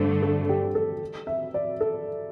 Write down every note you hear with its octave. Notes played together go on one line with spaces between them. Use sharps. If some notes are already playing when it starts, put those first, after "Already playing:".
Already playing: G2 D3 A3 C5 D5
A4
G4
A4
E5
D5
A4